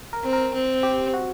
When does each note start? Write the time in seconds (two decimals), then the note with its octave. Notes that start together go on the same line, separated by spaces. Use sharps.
0.13 A#4
0.23 C4
0.33 A#4
0.54 C4
0.83 G4
1.14 F#4